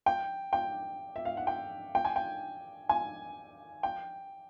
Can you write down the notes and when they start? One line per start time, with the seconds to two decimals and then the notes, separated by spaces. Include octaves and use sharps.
0.06 G5
0.53 G5
1.16 E5
1.25 F5
1.37 F#5
1.47 G5
1.95 G5
2.05 G#5
2.16 G5
2.89 G#5
3.83 G5